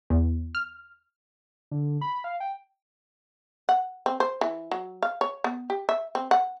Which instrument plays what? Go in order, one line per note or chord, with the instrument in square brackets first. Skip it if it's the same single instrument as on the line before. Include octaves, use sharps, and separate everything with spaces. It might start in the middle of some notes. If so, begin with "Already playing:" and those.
[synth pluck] E2
F6
[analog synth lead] D3
B5
F5
G5
[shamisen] F#5
C4
C5
E3
F#3
F5
C#5
B3
G4
E5
C4
F#5